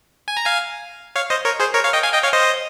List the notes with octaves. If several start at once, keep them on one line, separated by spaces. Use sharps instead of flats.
G#5
A#5
F5 G#5
C#5 F5
C5 D#5
A#4 C#5
G#4 C5
A#4 C#5
C#5 F5
D#5 G5
F5 G#5
D#5 G5
C#5 F5
C5 D#5